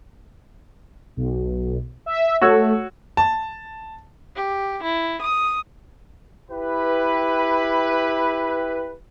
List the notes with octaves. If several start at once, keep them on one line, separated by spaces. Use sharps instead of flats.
B1
E5
A3 F#4 C#5 E6
A5
G4
E4
D#6
E4 G4 B4